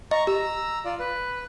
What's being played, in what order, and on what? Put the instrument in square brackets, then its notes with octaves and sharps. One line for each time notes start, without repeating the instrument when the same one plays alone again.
[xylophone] D#5 [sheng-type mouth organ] A#5 C#6
[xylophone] G4 [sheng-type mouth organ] A#5 E6
[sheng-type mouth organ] F4 D5
B4